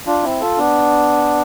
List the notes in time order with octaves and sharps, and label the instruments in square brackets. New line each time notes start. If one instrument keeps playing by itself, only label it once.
[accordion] D4 F4
C4 E4
F4 A4
B3 D4